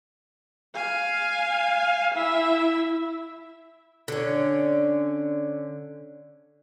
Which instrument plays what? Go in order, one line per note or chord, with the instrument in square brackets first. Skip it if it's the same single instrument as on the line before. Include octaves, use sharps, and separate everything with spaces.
[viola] F5 G#5
E4 E5
[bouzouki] D3 C#4